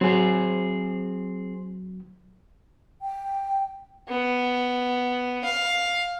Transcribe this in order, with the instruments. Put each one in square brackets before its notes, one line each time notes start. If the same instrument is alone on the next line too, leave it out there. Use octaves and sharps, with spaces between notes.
[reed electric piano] F#3 [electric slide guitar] C4 G#4
[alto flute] G5
[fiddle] B3
F5